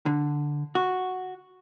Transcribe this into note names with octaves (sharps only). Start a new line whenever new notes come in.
D3
F#4